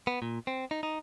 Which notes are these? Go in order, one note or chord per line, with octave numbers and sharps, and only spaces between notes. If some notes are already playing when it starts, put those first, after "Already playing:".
B3
A#2
C4
D#4
D#4